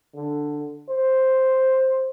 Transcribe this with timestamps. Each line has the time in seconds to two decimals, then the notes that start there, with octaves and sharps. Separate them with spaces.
0.15 D3
0.89 C5